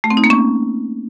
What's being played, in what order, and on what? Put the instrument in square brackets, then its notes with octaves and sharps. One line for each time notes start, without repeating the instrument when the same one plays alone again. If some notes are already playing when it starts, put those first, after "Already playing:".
[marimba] A3
C4
D#4
A#3
C#4